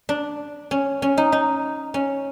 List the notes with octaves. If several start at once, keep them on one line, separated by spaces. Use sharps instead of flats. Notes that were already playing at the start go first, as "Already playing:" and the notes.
D4
C#4
C#4
D#4
D#4
C#4